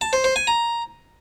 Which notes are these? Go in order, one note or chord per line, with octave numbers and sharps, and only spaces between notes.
A5
C5
C5
G#5
A#5